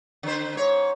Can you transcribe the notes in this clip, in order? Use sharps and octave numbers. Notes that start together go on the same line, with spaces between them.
D3 C5
G#2 C#5